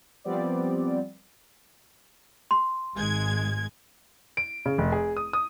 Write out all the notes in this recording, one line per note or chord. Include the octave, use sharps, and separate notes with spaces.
F3 G3 B3 C4 D5
C6
G#1 G#3 G#6
D7
C#3
F1
G#4
D#6
D#6